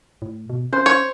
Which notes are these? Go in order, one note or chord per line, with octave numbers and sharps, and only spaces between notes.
A2
B2
C#4 C5
C#5